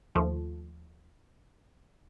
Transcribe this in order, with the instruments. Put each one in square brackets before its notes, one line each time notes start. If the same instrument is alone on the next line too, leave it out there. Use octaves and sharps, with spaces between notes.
[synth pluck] D#2 F3 A3